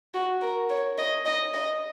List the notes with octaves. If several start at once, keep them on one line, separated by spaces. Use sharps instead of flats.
F#4
A#4
C#5
D#5
D#5
D#5